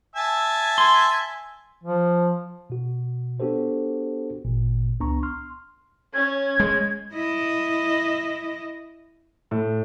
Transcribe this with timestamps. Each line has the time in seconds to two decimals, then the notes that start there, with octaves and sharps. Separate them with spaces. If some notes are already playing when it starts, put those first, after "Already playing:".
0.16 E5 G#5 A5
0.78 C6
1.84 F3
2.70 B2 F#4
3.40 B3 D4 F#4 G4 A4 C5
4.45 G#1 A#2
5.00 C#2 B3 D4 A#5 C#6
5.23 C6 F6
6.14 C#4 G#6
6.60 G#3
7.13 E4 D#5
9.51 A2